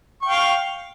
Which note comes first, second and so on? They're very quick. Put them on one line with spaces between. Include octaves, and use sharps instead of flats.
C#6 G5 F5